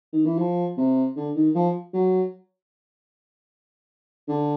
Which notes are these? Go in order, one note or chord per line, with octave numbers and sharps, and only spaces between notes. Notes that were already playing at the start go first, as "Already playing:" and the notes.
D#3
E3
F3
C3
D3
D#3
F3
F#3
D3